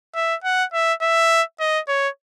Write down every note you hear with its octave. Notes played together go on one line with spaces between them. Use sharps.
E5
F#5
E5
E5
D#5
C#5